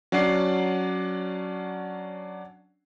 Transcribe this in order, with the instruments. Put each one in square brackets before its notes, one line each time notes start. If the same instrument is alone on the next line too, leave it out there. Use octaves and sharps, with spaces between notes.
[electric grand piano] F#3 C#4 D4 D5 F#5 C7